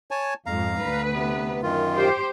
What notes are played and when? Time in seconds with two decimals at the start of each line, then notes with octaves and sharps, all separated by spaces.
0.11 C#5 G#5 A5
0.46 F2 G#2 F5 A#5
0.81 D2 B4
1.13 C3 B3
1.62 F#2 D#3 F4
1.96 G4 C5